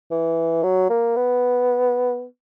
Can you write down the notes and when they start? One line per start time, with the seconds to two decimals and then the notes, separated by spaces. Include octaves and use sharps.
0.11 E3
0.64 F#3
0.90 A#3
1.16 B3